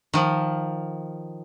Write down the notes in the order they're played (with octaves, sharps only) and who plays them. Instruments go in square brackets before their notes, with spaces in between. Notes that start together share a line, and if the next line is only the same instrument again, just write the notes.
[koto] D#3 F3